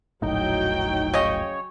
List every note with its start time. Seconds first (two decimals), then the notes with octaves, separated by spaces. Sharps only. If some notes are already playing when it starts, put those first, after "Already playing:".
0.22 E1 A#1 A2 F#3 D#4 G5
1.14 C#3 C#4 C#5 D#5